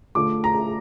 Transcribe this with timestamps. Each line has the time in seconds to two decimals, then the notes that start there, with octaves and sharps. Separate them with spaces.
0.15 D3 A3 D4 F4 D6
0.44 A#5